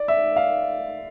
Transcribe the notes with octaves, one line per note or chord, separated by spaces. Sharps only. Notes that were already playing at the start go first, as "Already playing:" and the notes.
Already playing: D5
E5
F5